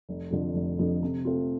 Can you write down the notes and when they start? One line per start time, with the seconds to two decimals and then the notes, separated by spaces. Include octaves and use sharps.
0.09 F1
0.31 F2 D3 F3
0.54 F1
0.79 F2 D3 F3
1.02 C3
1.25 A3 C4 F4